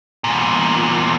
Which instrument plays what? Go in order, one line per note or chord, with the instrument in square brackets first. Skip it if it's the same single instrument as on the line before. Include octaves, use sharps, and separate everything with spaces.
[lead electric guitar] E2 A#2